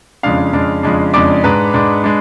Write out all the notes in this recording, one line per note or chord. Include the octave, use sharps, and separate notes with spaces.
F2 C#3 G#3 D4 F5 F6
F2 C#3 G#3 D4
F2 C#3 G#3 D4
F2 C#3 G#3 D4 D5 D6
G#2 G#3 D4 B4 B5
G#2 G#3 D4
G#3 D4